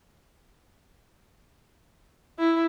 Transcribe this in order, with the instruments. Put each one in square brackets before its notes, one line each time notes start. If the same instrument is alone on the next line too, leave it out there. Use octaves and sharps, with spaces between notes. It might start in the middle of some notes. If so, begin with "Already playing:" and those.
[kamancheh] E4